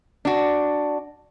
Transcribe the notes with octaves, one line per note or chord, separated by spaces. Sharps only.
D4 F#4